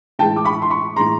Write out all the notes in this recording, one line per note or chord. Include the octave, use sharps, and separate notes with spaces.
A2 E3 G#3 G5 A5
D6
B5 C#6
C6
B5 C#6
A2 E3 G#3 A#5 C6